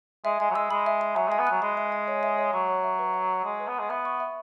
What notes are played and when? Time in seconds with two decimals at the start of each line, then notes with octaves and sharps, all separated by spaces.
0.25 G#3 E5
0.40 G#3 G#5
0.50 F#3
0.55 G#3 E6
0.70 G#3 B5
0.86 E5
1.01 G#5
1.16 F#3 E5
1.28 G#3 G#5
1.39 B3
1.47 F#3 F#6
1.62 G#3 B5
1.77 E5
1.92 G#5
2.08 C#5
2.23 E5
2.38 C#5
2.53 F#3 C#6
2.69 C#5
2.84 E5
2.99 B4
3.14 F#5
3.29 E6
3.44 G#3 C#6
3.60 B4
3.68 B3
3.75 G#3 F#5
3.90 B3 E5
4.05 C#6
4.20 E5